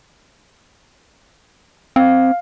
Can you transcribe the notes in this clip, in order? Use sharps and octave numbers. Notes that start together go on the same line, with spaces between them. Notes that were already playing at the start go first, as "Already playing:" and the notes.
C4 F5